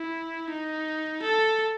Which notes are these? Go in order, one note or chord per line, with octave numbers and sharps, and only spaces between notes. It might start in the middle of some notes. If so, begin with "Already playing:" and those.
Already playing: E4
D#4
A4